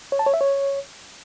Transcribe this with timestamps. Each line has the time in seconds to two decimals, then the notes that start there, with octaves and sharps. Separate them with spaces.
0.12 C#5
0.19 A5
0.26 C#5
0.34 E5
0.41 C#5